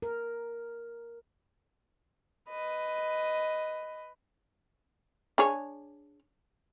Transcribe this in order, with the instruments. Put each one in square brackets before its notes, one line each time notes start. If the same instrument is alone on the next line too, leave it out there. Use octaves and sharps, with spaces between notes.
[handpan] A#4
[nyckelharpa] B4 D#5
[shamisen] D4 G#4 C#5